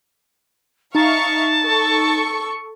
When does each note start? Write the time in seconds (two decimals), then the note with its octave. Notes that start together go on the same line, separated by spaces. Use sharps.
0.95 D#4 E5 F5 A5 C#6
1.63 A4 C#6